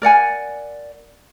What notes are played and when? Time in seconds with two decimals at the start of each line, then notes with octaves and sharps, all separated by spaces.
0.02 A#4 D5 F#5 G#5